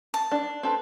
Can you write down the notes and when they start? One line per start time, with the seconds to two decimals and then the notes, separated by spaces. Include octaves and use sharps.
0.14 A5
0.32 D4
0.63 C4 A4 B4